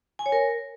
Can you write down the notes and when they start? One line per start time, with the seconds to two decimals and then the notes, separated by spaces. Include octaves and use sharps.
0.19 G#5
0.26 C#5
0.32 A#4